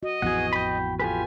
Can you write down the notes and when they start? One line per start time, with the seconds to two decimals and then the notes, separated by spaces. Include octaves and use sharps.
0.03 F#4 D#5
0.22 A1 F2 E3 B3 F#4 G#4 F#5
0.53 G5 B5
1.00 F4 G4 A4 B4 G#5